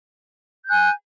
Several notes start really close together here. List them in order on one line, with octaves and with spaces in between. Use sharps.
G6 F#6 G#5